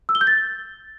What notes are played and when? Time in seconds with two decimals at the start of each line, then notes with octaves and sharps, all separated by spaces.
0.09 E6
0.15 G7
0.21 G6
0.27 A6